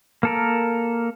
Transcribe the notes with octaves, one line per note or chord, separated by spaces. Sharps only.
A#3 A4 A#4